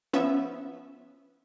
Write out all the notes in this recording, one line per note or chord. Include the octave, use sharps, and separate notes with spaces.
F3 B3 C#4 E5